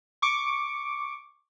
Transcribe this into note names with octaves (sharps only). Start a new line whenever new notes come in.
C#6 D6 C#7 D7